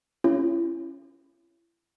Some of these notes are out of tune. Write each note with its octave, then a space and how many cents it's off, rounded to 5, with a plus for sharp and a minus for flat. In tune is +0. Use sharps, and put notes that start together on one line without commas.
C#4 +0 E4 +40